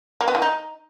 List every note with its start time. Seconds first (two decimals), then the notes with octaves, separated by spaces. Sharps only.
0.21 A#3
0.28 B3
0.35 E3
0.42 D#4